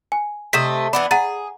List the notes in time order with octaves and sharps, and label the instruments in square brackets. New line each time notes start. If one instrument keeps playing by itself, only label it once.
[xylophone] G#5
[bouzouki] C3 A3 D#5 [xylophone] B6 E7
[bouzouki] E3 B3 D4 [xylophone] B5
[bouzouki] G#4 [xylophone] F#5 A#5 A6